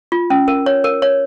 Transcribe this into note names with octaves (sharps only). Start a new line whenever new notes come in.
F4
C#4
A#4
C#5
A#4
C#5